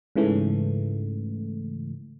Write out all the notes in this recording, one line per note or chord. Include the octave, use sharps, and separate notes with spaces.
G#2 C#3 E3 A3